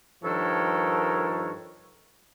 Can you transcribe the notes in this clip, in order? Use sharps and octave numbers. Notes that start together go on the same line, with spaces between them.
G2 D#3 F3 A4 A#4 C#5